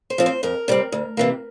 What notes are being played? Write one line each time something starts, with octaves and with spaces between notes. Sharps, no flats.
C5
F3 C4
C5
F2 A#4
C3 G3 C4
D2
C3 E3 A#3